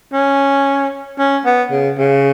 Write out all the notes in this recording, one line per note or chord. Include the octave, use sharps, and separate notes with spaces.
C#4
C#4
B3
C#3
C#3